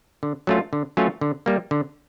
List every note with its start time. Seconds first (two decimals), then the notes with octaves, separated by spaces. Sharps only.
0.23 D3
0.47 F#3 A3 C#4 F4
0.73 D3
0.97 F#3 A3 C#4 F4
1.21 D3
1.46 G3 A#3
1.71 D3